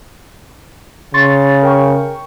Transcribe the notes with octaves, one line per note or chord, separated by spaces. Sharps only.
C#3 C6 C#6 A6
A#4 G5 C#6